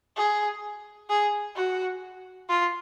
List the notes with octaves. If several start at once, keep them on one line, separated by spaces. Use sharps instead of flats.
G#4
G#4
F#4
F4